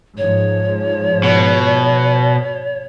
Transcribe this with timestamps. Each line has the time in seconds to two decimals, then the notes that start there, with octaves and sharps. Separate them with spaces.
0.17 G#2 F3 C#5
1.23 B2